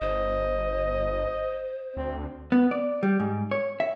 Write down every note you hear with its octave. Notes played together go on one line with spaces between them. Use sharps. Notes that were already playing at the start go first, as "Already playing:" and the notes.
G1 C5 D#5
D2 C4
B3
D5
G3
G#2
C#5
E5